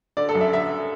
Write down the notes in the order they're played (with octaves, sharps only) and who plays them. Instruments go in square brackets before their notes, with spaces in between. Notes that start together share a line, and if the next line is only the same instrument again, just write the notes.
[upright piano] D3 D5
A4
F#2
E5
D3 E5